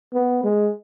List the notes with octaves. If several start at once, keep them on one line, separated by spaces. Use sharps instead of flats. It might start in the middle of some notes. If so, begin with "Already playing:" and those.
B3
G#3